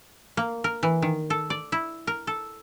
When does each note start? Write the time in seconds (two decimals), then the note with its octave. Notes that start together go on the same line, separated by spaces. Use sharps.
0.37 A#3
0.64 A#4
0.83 E3
1.02 D#3
1.30 A4
1.50 D5
1.72 E4
2.07 A#4
2.27 A4